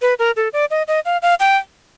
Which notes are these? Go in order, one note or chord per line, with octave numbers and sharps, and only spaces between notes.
B4
A#4
A4
D5
D#5
D#5
F5
F5
G5